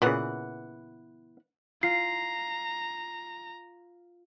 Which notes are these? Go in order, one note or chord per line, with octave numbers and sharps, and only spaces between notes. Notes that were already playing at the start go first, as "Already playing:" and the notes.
A#2 C#3 E3 B3 F#5
F4 A#5 C7